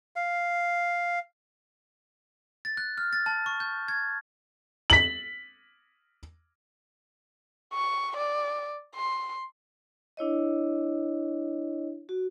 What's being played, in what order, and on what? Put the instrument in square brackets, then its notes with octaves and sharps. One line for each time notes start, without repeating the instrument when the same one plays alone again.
[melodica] F5
[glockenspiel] A6
F#6
F6
A6
A5
C#6
G6
G#6
[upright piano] B6 F#7
[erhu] C#6
D5
C6
[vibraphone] D4 E4 C#5 D#5
F#4